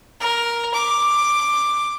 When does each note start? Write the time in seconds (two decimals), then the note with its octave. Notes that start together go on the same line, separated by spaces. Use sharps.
0.21 A#4
0.74 D6